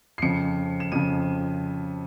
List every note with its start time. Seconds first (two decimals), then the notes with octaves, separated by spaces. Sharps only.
0.18 C7
0.22 F2 C#3 F3 C#7
0.80 E7
0.92 F2 C#3 F3 D#7